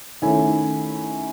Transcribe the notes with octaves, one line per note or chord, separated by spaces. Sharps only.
D#3 A3 C#4 E4 G#5